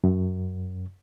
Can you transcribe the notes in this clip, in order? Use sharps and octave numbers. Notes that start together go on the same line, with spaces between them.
F#2